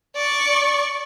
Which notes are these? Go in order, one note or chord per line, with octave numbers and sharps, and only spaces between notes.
D5 C#6